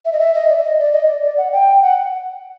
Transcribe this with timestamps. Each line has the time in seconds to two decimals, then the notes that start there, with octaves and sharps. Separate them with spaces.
0.05 E5
0.12 D#5
0.19 E5
0.34 D#5
0.49 D5
0.56 E5
0.64 D#5
0.79 D5
0.92 D#5
1.06 D5
1.23 D5
1.38 F#5
1.52 G5
1.82 F#5